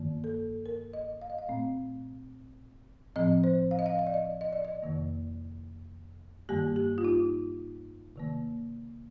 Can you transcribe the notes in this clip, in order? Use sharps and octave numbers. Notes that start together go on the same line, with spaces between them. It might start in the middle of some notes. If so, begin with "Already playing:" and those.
Already playing: G2 D#3 A#3
A4
A#4
D#5
F5
D#5
F5
A#2 A3 C4
A2 F3 C4 D#5
C5
F5
D#5
F5
D#5
D5
D#5
D#5
D5
D#5
F2 C3 D#3 A#3
G2 D#3 G3 A#3 G4
G4
F4
D#4
C3 D#3 A#3